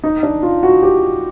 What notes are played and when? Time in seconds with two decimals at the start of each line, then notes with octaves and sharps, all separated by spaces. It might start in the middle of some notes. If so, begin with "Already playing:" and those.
0.04 D#4
0.23 D4
0.43 F4
0.63 F#4
0.83 G4